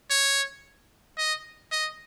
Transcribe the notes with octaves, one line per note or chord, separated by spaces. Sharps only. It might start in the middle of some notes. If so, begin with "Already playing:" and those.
C#5
D#5
D#5